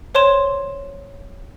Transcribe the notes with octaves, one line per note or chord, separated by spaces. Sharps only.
C5 C#5 C6 E7